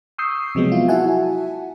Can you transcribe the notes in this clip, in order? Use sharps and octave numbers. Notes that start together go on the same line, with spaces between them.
C#6 D#6 E6 G6 C7
C3 F3 F#3 G#3 B3
E4 F4
E4 F#4 E5 F#5 G#5 A5